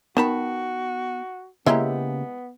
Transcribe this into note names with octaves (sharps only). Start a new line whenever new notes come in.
D#3 B3 F#4 A5 B5
C#3 G#3 A#3 B3 E4 G4 E5